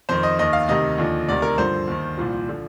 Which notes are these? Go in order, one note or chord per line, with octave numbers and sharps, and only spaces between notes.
F2 D#3 C5
D#5
D#2 D#3 D#5
F5
D2 C3 D#3 D#5
D#2 D3 F3
D2 C3 D#3 D5
A#4
G2 D3 F3 C5
D#2 D#3
C2 A#2 F3
D3 F3